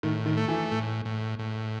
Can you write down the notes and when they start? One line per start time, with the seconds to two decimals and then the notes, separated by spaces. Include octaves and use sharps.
0.03 A2 D#3
0.26 D#3
0.37 A3
0.48 E3
0.71 A2
1.05 A2
1.39 A2